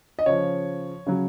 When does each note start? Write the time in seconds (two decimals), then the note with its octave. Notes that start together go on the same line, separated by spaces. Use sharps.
0.19 D#5
0.26 C#3 F3 C#5
1.06 C#3 F#3